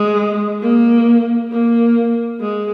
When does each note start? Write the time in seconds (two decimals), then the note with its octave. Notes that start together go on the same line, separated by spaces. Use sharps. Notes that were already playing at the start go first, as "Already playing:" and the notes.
Already playing: G#3
0.61 A#3
1.51 A#3
2.40 G#3